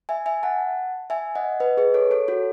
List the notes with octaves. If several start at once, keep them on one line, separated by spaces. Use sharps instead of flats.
E5 G#5
E5 G#5
F#5 A5
E5 G#5
D#5 F#5
B4 D#5
G#4 B4
A4 C#5
A4 C#5
F#4 A4